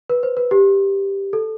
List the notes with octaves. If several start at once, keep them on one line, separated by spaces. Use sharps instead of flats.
B4
C5
B4
G4
A4